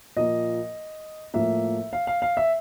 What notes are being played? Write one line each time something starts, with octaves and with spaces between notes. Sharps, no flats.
A#2 F3 A#3 D#5
A2 F3 A#3 E5
F5
F5
F5
E5